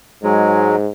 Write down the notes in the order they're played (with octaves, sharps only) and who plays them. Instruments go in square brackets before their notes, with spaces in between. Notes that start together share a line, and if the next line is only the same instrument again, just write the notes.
[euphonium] G#2 [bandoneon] F#3 G#3